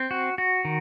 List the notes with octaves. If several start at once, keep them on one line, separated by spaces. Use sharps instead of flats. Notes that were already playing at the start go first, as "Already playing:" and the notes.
Already playing: C4
F#4
F#4
D#3